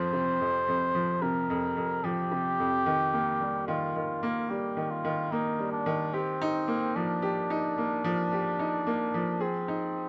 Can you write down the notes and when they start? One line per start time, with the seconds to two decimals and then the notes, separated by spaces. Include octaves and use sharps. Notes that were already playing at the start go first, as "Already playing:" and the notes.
Already playing: F2 F3 C5
0.13 C3
0.41 F2
0.68 F2
0.95 F3
1.22 C3 A#4
1.50 F2
1.77 F2
2.04 F3 G4
2.31 C3
2.59 F2
2.86 D#3
3.13 A#3
3.41 G3
3.68 D#3 F4
3.96 D#3
4.23 A#3
4.50 G3 G4
4.77 D#3
4.91 F4
5.05 D#3
5.32 A#3 D#4
5.59 G3
5.72 D4
5.86 D#3
6.13 C4 G4
6.41 D#4
6.68 A#3
6.95 F3 D4
7.22 G4
7.50 D#4
7.78 A#3
8.04 F3
8.32 G4
8.59 D#4
8.87 A#3
9.14 F3
9.40 C4 G#4
9.68 D#4